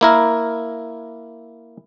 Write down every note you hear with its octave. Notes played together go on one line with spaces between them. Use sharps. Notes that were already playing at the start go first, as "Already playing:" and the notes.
A#3 E4 A#4